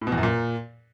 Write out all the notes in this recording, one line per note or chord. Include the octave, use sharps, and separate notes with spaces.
A2
B2
E2
F#2
A#2